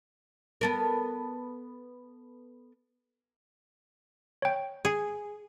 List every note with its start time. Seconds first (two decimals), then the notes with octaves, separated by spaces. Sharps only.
0.61 B3 A4 A#4
4.42 C#5 G5
4.85 G#4